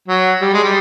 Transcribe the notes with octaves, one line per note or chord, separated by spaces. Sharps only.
F#3
G3
G#3
G3